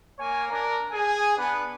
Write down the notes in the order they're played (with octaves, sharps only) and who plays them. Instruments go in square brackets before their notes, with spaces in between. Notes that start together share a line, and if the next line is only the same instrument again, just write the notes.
[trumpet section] A#3 C#5 G#5
D4 A#4
G#4 G#5
B3 D4 B4